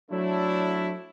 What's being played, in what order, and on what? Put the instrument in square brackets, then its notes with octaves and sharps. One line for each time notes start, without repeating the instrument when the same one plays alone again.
[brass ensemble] F#3 A3 D4 E4